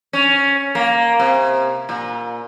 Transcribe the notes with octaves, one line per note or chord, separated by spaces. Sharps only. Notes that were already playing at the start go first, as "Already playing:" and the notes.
C#4
A#3
C3
A#2